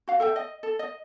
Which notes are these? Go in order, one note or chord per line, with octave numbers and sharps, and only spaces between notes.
F#4 F5
A4 E5 G5
D#5
A4
D#5